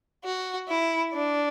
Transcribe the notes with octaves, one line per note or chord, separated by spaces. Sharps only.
F#4
E4
D4